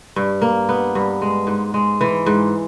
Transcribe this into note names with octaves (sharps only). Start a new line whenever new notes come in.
G2
A#3
B3
G2
G#3
G#2
G#3
E3
G#2